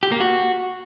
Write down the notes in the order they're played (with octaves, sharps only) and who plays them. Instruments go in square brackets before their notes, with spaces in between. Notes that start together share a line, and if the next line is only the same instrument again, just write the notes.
[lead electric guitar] G4
A#3
F#4